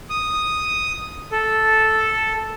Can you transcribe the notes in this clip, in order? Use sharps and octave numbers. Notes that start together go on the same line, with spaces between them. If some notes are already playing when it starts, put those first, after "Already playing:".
D#6
A4